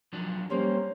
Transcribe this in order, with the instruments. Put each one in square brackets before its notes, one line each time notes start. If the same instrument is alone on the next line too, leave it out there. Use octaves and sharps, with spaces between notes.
[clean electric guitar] F3 F#3 D4
[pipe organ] G3 C#4 C5 [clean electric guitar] A#3